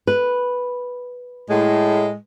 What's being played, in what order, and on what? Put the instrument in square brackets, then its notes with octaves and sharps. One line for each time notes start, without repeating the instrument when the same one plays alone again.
[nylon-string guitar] B4
[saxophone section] A2 G#3